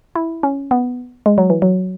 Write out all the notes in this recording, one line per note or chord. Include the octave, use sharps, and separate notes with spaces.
E4
C#4
B3
G#3
F#3
E3
F#3